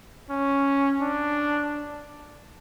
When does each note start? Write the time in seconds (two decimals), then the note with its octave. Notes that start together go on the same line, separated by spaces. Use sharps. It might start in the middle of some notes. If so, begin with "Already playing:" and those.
0.30 C#4
1.02 D4